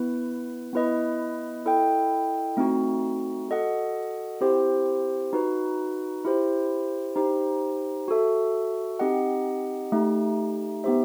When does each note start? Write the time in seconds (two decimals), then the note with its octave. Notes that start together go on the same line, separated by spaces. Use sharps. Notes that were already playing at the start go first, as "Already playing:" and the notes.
Already playing: B3 E4 B4
0.73 B3 E4 B4 D#5
1.66 E4 A4 D#5 G5
2.57 A3 C4 D#4 F#4
3.49 F#4 A4 D#5 F#5
4.40 C4 E4 G4 C5
5.33 D#4 F#4 B4
6.25 E4 G4 C5
7.16 D#4 G4 C5
8.08 F#4 A4 E5
8.99 C4 D#4 G4 D#5 F#5
9.92 A3 D#4 G4
10.84 B3 D#4 G4 C5 E5